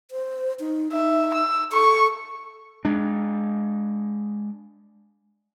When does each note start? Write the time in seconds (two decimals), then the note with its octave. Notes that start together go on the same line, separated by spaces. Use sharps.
0.11 C5
0.60 D#4
0.92 D#4 E5
1.34 E6
1.72 A4 C#6
2.85 G#3 D4